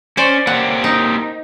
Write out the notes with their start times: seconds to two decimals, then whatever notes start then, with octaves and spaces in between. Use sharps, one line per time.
0.17 C#4 C5 D5
0.47 A#3 C4 G4 F#5
0.84 D#4